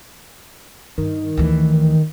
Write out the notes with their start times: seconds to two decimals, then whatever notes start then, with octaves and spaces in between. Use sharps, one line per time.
0.98 G2 D#3
1.37 D2 E3